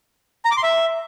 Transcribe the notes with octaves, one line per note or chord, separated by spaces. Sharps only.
A#5
D6
C6
E5